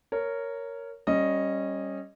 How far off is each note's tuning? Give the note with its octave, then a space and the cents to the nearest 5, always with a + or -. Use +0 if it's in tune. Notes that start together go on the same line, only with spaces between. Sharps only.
A#4 -10 C#5 +5
G3 +0 C#4 -15 D#5 +0